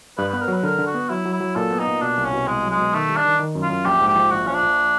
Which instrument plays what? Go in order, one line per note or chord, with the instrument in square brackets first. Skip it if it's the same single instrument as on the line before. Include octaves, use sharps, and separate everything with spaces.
[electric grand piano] G2 [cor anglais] B4
[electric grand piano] B3 [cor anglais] B4
[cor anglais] A#4
[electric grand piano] F#3 [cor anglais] B4
[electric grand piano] D3 [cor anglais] A#4
[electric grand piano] D3
[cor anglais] F#4
[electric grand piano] B3
[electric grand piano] F#3 [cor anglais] E4
[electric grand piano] F#3
[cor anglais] E4
[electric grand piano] F#3
[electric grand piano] A#2 [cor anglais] A4
[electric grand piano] B3
[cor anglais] D#4
[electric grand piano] A#2
[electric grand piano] B2 [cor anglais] D4
[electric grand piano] C2
[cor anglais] C#4
[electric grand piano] B2
[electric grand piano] C2 [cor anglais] G#3
[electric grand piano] F#3
[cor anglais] G#3
[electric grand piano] B2
[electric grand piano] D#3 [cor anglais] A3
[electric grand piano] G3
[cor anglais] D4
[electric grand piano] D#3
D#3
F#2
[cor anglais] F4
[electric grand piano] F#2
[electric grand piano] A#1 [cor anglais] G4
[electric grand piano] G#2
[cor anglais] G4
[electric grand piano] F3
[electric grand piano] A#1 [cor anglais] F#4
[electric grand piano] F3 [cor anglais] C#4
[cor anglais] D4
[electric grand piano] A#1